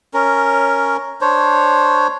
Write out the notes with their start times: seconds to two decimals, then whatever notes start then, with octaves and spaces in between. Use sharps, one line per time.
0.14 C#4 A#4
1.21 D4 C5 C#5